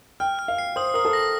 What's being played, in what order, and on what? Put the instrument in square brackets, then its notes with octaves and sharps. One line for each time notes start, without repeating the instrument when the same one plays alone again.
[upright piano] G5 [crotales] F6
[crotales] F6
[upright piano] F5
[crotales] C7
[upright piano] C5 [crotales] D#6
[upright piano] A#4 [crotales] D#6
[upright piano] A4
[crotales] A#6